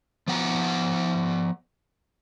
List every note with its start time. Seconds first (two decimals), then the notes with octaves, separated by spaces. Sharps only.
0.28 F3 B3 F#5 A#5